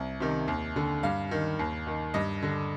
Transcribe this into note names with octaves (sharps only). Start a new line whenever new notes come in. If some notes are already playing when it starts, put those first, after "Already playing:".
Already playing: C2
C3 D#3
D#2
D3
G2 F5
D#3
D#2
D#3
G2 D#5
D3